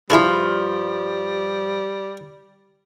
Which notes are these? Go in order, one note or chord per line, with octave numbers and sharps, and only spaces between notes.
G2 F3 G3 E4 G#4 A4